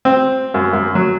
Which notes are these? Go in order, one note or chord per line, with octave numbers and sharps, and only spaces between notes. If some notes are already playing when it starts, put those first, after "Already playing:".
C4
F#2
F#2
F#3